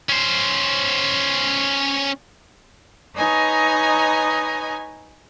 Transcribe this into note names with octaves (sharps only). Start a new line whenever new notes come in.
C#4 C5
D#4 B4 C#5 D#5 G#5 A#5